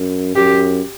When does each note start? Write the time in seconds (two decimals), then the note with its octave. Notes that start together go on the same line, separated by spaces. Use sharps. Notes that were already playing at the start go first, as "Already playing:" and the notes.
Already playing: F#2
0.36 F#2 G4